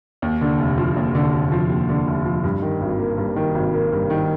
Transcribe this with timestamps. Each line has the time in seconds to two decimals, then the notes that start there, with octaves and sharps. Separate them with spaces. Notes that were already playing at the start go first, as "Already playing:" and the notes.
0.22 D#2
0.41 D3
0.59 F1
0.78 F3
0.96 D#2
1.15 D3
1.33 F1
1.52 F3
1.70 D#2
1.89 D3
2.07 F1
2.26 F3
2.44 G2
2.62 D#3
2.81 G#1
2.99 A#3
3.18 G2
3.36 D#3
3.55 G#1
3.74 A#3
3.92 G2
4.10 D#3